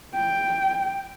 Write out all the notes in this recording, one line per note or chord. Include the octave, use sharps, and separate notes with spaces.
G5